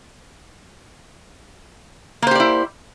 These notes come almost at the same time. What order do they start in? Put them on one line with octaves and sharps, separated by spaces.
A#3 C5 G4 D5 E4